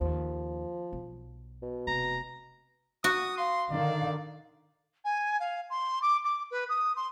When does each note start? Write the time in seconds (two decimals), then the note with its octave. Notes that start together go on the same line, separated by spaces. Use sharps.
0.01 D#2 F3
0.93 B1
1.62 B2
1.87 F1 A#5
3.04 F#4 D#6
3.38 F5 C6
3.71 D3 D#3 D5
5.04 G#5
5.39 F5
5.69 C6
6.02 D6
6.24 D6
6.50 B4
6.68 D#6
6.96 C6